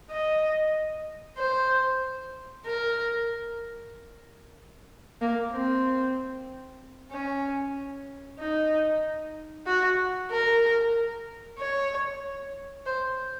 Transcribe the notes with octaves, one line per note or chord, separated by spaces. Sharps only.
D#5
C5
A#4
A#3
C4
C#4
D#4
F#4
A#4
C#5
C5